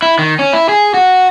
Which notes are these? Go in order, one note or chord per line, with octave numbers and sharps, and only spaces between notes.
E4
D#3
C#4
E4
G#4
F#4